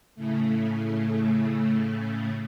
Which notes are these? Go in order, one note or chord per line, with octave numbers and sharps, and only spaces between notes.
A2 C#3 A3